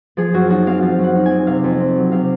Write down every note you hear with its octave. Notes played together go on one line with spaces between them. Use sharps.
F3 G#4
F#2 F#4
D#4 F#4
C4 F5
F3 F5
F#2
F#5
D#4
G#5
C4
C3 F5
F2
C4
F#3
C3 F5